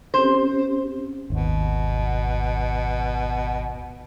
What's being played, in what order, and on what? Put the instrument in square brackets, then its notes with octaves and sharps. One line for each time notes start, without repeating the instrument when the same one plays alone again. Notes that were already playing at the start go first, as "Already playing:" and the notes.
[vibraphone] C4 C#4 G4 [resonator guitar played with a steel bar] C5
[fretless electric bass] G#1 D#2 [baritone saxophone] B2